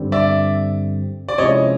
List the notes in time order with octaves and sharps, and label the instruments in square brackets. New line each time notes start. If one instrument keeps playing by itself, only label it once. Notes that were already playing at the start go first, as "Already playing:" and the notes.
Already playing: [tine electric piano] G2 D3 G3 C4
[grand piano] D5 E5
D5
[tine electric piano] C3 F3 G#3 C#4 E4 [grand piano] C#5 D#5